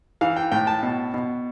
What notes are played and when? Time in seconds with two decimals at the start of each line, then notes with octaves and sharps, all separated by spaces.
0.21 E3 F5
0.36 G5
0.52 A2 G5
0.67 A5
0.83 B2
1.14 B2